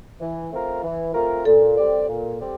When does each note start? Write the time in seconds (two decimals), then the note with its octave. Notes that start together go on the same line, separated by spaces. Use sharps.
0.20 E3
0.51 A3 C4 F4 A#4
0.83 E3
1.14 A3 C4 F4 A#4
1.45 A#2 A4
1.77 G3 C4 G4 D5
2.08 A#2
2.40 G3 C4 G4 D5